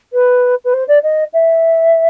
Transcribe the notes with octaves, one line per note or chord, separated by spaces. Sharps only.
B4
B4
C5
D5
D#5
E5